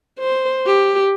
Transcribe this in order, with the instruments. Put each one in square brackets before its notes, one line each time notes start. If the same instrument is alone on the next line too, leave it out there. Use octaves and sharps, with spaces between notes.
[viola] C5
G4